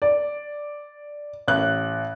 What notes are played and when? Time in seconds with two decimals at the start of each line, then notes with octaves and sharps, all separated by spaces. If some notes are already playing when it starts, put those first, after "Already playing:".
0.02 D5
1.48 A1 F#6